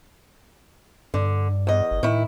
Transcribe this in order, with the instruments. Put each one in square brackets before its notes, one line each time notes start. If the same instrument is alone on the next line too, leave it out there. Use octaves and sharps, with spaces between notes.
[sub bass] G2 [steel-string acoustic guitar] D3
[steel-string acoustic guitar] E2 D#5
[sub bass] G1
[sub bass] A2 [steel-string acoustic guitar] D#3 E4